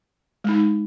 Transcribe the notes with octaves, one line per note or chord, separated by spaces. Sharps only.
G#3 D#4